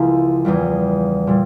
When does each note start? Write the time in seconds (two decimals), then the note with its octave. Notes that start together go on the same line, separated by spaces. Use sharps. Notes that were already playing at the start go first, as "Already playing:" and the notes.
Already playing: C#2 C#3 F3 A#3 E4
0.45 E2 C#3 E3 G3
1.27 A#2 G3